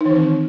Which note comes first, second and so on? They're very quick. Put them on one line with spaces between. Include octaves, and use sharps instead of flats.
D#4 E3 D#3 C4